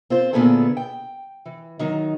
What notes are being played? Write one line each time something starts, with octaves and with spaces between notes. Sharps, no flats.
C4 F4 C5
A#2 D3 B3 E4 G#4 A4
G5
E3
D#3 F#3 D#4